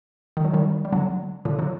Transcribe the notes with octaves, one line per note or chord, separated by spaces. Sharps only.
D#3
F#3
D#3 G3
G3
D3 F#3
A#2 D3
D3 F#3